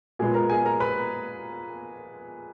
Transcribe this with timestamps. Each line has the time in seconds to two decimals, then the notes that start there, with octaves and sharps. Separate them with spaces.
0.19 A#2 G#3 B3 G#4 G#5
0.34 A#4 A#5
0.50 G#4 G#5
0.65 A#4 A#5
0.80 B4 B5